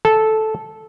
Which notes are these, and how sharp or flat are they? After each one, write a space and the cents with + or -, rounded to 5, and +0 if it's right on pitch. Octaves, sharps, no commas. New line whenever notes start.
A4 -10